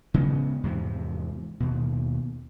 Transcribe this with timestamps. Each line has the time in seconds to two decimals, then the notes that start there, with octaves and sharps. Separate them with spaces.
0.14 C#3 G#3 B3
0.63 E2 G#2 C3 F3
1.60 D#2 B2